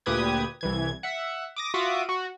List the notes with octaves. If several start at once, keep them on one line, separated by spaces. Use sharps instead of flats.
D2 A#2 G4 B4 D#6 G#6
C2 E3 G#6
E5 F#5
D6 D#6 A#6
F4 F#4 E5 D6 D#6
F#4